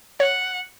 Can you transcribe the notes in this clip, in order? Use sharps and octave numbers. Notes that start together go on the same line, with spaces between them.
C#5 F#5